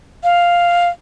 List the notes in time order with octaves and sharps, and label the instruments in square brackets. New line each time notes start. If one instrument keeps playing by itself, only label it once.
[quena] F5